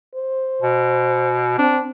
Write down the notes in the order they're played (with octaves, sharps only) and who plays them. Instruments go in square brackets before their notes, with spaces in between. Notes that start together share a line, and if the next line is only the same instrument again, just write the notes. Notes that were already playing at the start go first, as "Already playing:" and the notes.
[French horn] C5
[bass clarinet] B2
[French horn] C4 [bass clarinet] D4